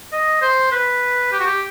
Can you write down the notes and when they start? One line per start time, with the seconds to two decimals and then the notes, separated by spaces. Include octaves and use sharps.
0.13 D#5
0.42 C5
0.72 B4
1.32 G4
1.40 F#4
1.47 G4